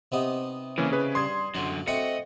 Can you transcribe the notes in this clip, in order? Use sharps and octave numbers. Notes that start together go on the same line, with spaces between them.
C3 B3 D#4
C#3 E3 A#3 C#4
C#4 G#4 B4
G2 C6 D#6 G#6
F#2 D3 F#3
A3 C4 F#4 D#5 C#7